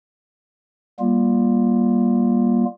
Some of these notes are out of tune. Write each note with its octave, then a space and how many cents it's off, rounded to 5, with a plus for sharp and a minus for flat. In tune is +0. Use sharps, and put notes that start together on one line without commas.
G3 +0 A#3 +30 F4 +0